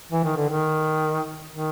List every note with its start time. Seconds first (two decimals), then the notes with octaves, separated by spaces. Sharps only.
0.12 E3
0.24 D#3
0.36 D3
0.49 D#3
1.51 D#3